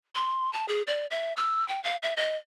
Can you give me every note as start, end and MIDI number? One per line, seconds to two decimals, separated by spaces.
0.15 0.53 84
0.53 0.66 81
0.68 0.82 68
0.87 1.06 74
1.11 1.33 76
1.37 1.67 88
1.68 1.82 79
1.84 1.97 77
2.03 2.14 76
2.17 2.36 75